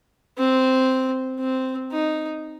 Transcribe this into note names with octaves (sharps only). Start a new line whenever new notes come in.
C4
C4
D#4